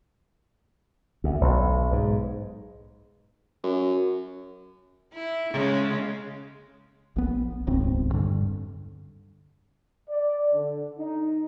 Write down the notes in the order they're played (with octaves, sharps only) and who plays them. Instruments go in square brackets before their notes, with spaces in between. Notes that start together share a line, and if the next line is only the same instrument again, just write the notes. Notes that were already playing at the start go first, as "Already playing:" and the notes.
[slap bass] D2
B1
G#2
[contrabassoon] F#2
[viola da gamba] E4
C#3 G#3
[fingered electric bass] A#1 B3
D#1 C#2 G#2 C4
G2 D3
[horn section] D5
D3
D#4